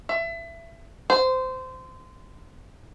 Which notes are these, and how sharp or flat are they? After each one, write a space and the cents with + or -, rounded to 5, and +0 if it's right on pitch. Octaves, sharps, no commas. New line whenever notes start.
E5 +25
C5 -20